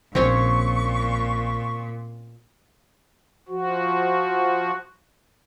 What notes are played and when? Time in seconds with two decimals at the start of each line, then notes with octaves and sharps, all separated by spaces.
0.15 A#1 A#2 C#3 C4 C#4 C#5 C#6
3.48 F3 F#4